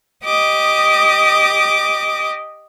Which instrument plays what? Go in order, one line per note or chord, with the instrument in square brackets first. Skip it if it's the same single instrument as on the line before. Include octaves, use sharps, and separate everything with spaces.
[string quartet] G4 D#5 D6 D#6